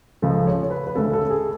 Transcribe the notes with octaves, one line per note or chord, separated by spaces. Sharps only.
C#2 C#3 F3 A4
C#5
C#5
B4
B4
D2 C#3 G#3 C#4 A4
A4
G#4